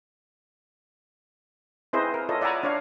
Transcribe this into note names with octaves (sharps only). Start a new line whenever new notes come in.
C4 E4 G#4 B4 C5 D#5
A#4
F4 A4 C#5 D#5
D5 E5 F#5 G#5 A#5 B5
D4 C#5 F5